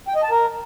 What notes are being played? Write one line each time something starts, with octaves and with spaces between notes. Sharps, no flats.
G5
D#5
A5
A#4